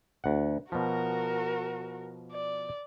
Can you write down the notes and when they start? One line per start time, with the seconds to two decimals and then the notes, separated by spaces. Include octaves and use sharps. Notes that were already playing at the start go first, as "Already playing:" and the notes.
0.24 D2 F#5
0.72 B2 F3 F#4 A#4
2.31 D5